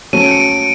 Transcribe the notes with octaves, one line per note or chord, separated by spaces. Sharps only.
F#3 A3 C#4 D#7
D7
C#7
D7